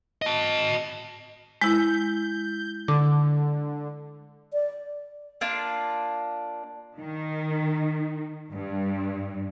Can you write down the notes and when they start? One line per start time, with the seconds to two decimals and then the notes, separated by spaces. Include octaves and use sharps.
0.22 D#5 A5
1.61 G#3 E4 G6
2.88 D3 D6
4.53 D5
5.41 A#3 D4 F4
6.99 D#3
8.52 G2